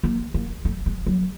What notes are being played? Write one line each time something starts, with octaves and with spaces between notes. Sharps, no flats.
A#3
A#3
A3
G#3
F#3